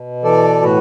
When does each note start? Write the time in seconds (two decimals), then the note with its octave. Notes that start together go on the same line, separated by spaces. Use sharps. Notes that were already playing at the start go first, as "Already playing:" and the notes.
Already playing: B2
0.24 E3 A4 D5
0.62 A2 F#4 B4